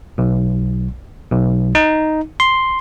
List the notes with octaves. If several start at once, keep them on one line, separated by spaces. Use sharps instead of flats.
B1
B1
D#4
C6